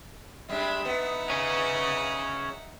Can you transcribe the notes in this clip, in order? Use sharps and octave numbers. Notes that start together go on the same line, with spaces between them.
G3 G#3 D4 E5 B5
B3 D#4 E5 F#5
C#4 G#4